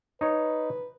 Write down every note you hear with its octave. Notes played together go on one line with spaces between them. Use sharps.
D#4 B4 C#5